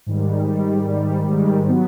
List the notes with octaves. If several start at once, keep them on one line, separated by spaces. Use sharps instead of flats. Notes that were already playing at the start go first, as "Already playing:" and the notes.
G#2 D#3 G3
G#2 D#3 G3
G#2 D#3 G3
G#2 D#3 G3
F#3 B3